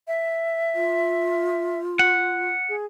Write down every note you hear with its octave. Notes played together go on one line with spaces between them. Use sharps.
E5
F4
F#5
G#4